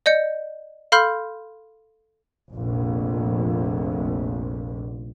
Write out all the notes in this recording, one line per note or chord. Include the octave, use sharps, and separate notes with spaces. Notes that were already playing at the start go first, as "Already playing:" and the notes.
D5 D#5 G6 C#7
A4 F5 B5 C6 F6 G6
F1 A#1